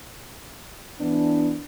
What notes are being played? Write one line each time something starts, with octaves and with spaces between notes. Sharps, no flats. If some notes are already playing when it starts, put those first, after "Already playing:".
E3 B3 D4